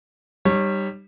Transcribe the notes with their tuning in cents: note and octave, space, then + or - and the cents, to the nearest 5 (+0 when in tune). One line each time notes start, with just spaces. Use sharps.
G3 +0 D#4 -35 C#5 -20